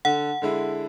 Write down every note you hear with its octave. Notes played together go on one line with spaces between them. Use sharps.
D3 F#5
D3 G#3 E4